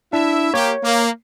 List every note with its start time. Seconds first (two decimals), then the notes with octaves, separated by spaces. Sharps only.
0.13 D4 E4 E5
0.54 A#3 G4 C#5
0.83 A#3